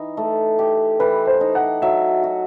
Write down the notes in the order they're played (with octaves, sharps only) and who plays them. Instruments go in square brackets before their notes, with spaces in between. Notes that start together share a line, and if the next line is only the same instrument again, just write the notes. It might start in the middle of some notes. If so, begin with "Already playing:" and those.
Already playing: [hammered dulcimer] E3 D#4
A3
G4
[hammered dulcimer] E3 [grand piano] B4
[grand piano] C5
[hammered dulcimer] D#4
[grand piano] F#5
[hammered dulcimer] F#3 [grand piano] E5
[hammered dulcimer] F#4